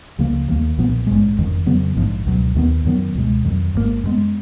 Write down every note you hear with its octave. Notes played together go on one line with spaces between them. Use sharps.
C#2 C#3 F3 A#3
D#2 D#3 F#3 A#3
B1 A#2 F3 B3
A#1 G#2 D#3 G#3
F#1 F2 D#3
F2 C#3 F#3 B3
A#1 G#2 F3
C#2 B2 F#3
D#2 D#3 G#3 B3
F#2 D#3 F#3 B3
C#2 B2 G#3
F2 D#3 F#3
G#1 G#2 D#3 A#3
F#2 D#3 G#3 B3